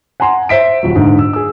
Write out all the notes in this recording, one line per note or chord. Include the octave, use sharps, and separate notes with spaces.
F#5 G#5 A#5 C6
C5 E5 B6 D7
D#1 F#3
G#2 D3
E6
G#4 E6